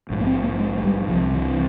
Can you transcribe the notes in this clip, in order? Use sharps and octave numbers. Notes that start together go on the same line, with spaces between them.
A#1 G#2
A#3
C4
A#3
G#3
G#3
G3
C2 C3 F3
E3